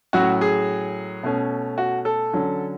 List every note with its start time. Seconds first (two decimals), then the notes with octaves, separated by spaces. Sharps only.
0.13 A2 F#3 C#4 F#4
0.41 G#4
1.23 B2 A3 C#4
1.78 F#4
2.05 A4
2.33 D3 F#3 C#4